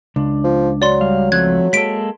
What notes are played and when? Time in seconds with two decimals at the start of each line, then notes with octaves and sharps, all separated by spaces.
0.16 C#2 D4
0.44 F3
0.82 F#3 D5 C6
1.01 G3 F5
1.32 F3 A3 C4 F#6 G#6
1.73 G#3 A#3 A4 B6 D7